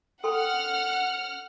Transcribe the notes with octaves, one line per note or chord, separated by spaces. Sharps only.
A4 F#5 G5 C6 F6